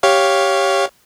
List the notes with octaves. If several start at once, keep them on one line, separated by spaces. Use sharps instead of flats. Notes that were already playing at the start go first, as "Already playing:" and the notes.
G4 C#5 F5